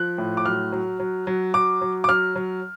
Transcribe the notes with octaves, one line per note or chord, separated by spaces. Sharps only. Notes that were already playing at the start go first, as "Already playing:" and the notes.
Already playing: F3 F#6
A2
D6
F#3 F6
F#3
F#3
F#3
F#3 D6
F#3
D6
F#3 F6
F#3